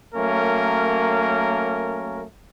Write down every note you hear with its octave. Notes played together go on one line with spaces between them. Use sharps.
F#3 A3 A#3 C#4 A#4